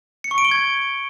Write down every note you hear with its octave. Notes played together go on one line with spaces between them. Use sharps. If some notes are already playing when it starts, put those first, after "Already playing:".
C#7
C#6
D7
G7
G#6